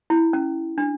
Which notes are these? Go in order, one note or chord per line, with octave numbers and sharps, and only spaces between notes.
E4
C#4
D4